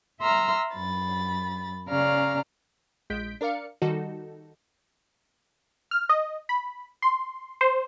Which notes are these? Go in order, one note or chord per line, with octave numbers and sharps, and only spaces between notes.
E5 A#5 C6 E6 F6
F#2 B5 A6
C#3 C#4 D5 F5 A#5 F6
A#1 G#3 G6 B6 D7
D4 A#4 D5 F5 C#7
D#3 G3 D#4 F#4 A4
F6
D#5
B5
C6
C5